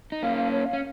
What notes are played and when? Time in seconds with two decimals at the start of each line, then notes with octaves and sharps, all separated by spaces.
0.12 D#4
0.23 A#3 C#4 F5
0.37 F5
0.51 C#5
0.66 F5
0.73 C#4